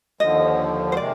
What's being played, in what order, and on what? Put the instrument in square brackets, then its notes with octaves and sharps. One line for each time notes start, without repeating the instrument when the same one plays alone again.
[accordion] D#2 D3 F3 [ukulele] D#5
[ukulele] C5
[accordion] C3 D#3 G#3 [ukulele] D5